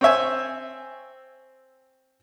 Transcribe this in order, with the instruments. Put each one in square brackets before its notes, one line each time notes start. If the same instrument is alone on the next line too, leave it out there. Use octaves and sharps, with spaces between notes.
[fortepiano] C4 C#5 E5 G#5